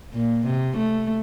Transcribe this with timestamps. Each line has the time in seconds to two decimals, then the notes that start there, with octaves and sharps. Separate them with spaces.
0.14 A#2
0.46 C3
0.78 A3